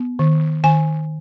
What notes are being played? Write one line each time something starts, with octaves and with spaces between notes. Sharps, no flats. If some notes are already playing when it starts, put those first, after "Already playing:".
Already playing: B3
D#3
D#3 G#5